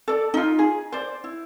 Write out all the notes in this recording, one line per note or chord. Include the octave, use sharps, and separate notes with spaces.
A4 D5
D#4 F4
G#4
C5 D5
E4